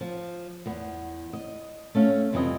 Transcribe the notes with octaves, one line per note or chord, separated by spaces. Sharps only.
F3
E2 B3
D#5
A3 C#4 F5
F2 C3 E3 G3 B4 D#5